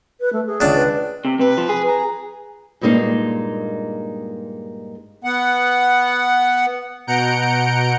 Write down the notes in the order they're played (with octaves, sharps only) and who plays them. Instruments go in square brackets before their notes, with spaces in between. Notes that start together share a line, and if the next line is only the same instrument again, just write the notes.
[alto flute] B4
A3
G#4
[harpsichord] C#2 D4
[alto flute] B4
[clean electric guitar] C3
[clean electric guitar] C3 [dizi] B4
[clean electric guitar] F3
G#4
[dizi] A#5
[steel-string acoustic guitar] G2 A#2 G#3 A#3 D#4
[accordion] B3 F#5
[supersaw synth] B2 F#5 A#5 G6 C#7 D7